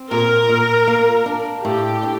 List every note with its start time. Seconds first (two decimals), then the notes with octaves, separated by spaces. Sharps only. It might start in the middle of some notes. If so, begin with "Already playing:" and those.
Already playing: C4
0.11 A#2 A#4
0.49 A#2
0.88 A#3
1.26 D4
1.64 A2 G4
2.03 D4